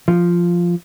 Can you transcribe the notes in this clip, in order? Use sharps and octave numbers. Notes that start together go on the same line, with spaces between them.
F3